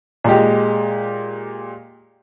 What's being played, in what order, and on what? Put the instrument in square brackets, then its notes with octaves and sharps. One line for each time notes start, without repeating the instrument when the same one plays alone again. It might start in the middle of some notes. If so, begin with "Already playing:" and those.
[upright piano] A#2 G#3 G4